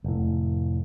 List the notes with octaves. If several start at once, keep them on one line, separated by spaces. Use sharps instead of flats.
F1 A2